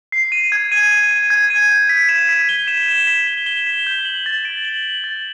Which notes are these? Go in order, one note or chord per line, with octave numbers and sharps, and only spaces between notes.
C7
D#7
G#6
D#7
D#7
D#7
G#6
D#7
G6
B6
E7
B6
G7
E7
E7
B6
G7
G7
B6
G6
F#7
A6
D7
F#7
F#7
A6